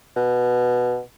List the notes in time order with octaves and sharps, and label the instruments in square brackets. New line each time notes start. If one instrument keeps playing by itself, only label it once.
[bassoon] B2